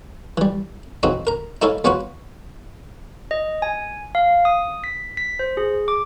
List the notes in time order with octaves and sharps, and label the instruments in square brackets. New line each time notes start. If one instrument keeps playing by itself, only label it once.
[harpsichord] E3 G3
C#3 E3 C4 D#4 F#4
A#4 A#5
D#4 E4 G#4 A4 C#5 F5
E2 B3 C#4 F4 F#4 B4
[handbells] D#5
G#5
F5
D#6
B6
B6
C5
G#4
D6